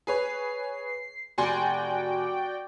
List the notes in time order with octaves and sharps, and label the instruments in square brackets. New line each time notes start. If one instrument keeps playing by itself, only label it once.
[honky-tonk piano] G#4 B4 C#5 [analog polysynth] C7
[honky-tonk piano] F1 G#5 C6 [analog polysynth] F#4 D5 G5